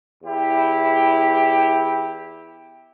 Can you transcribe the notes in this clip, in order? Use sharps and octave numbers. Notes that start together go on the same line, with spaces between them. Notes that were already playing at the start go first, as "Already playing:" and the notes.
E2 E4 G4